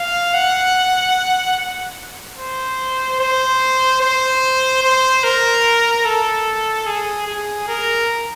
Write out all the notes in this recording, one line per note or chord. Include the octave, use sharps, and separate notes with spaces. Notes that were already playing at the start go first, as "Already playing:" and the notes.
Already playing: F5
F#5
C5
C5
C5
C5
A#4
A4
G#4
G#4
A#4